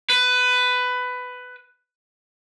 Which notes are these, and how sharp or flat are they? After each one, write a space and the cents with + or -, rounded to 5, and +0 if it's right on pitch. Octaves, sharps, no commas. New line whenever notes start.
B4 +15